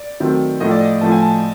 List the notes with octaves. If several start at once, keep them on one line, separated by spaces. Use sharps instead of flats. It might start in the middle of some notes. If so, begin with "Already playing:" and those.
Already playing: D5
D#3 F#3 A3 C4
A2 F3 A3 D#5
D5
D#5
A2 F3 A3 A5
G#5
A5